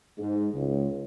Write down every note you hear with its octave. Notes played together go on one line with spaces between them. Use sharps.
G#2
C#2